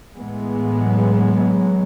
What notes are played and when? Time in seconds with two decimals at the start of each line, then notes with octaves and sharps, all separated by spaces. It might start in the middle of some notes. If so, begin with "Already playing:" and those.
0.15 A2 E3 G#3 B3
0.77 F#3